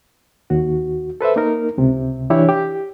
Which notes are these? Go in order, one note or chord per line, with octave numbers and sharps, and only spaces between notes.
D#2 F#4
A4 B4 C5 E5
A#3 D#4 A#4
C#2 C3
E3 D4 E4 G4 C#5
G4